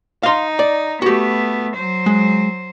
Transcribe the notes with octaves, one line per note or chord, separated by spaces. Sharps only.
D#4 F5 C6
D5
A3 B3 F#4 G4
F#3 C5
G#3